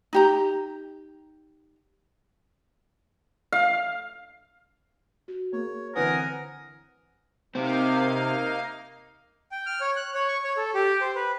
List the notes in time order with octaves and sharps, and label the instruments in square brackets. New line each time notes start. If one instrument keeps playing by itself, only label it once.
[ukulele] D#4 G4 A#5
[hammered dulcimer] F5
[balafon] F#4
[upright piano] A#3 G#4 [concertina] C#5
[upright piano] D3 E3 C4 [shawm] A#4 [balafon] B4 [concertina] F#5 G#5 D#6
[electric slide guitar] C3 C4 [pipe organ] A#3 D#4 F5
[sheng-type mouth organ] G5
F6
C#5
F#6
C#5
C#6
C#5
A4
G4
C5
B4